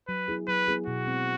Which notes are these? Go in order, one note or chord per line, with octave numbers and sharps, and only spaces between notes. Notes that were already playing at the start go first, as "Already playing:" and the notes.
F#3 B4
B3 E4 G#4
F#3 B4
B3 E4 G#4
B2 F#4
G#3 C4